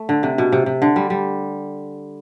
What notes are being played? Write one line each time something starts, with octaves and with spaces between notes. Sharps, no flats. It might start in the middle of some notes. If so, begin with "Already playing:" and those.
Already playing: A3
D3
C3
B2
C3
C3
D3
G3
G3